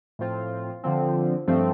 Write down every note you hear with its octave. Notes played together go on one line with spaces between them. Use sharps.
A2 F3 C4 F4
D3 F3 C4
G2 F3 A3 C4